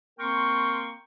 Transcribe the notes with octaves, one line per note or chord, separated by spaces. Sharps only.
A#3 C4 A#4 G5 C6 C#6